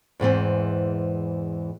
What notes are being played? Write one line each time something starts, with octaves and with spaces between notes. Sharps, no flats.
E2 G#2 E3 C4